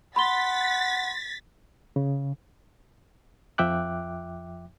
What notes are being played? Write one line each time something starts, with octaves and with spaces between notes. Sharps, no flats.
F#5 B5 C6 A6 B6 G7
C#3
F2 F3 E5 G5 D6 F#6